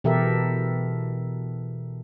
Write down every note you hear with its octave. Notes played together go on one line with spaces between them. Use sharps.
B2 E3 G4 A4 A#4 E5